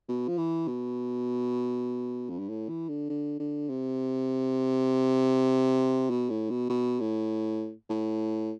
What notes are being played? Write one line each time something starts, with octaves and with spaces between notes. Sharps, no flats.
B2
F3
E3
B2
F2
G2
A2
E3
D3
D3
D3
C3
B2
A2
B2
B2
A2
A2